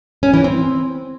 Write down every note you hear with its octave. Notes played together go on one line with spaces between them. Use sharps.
C#4
E3
C4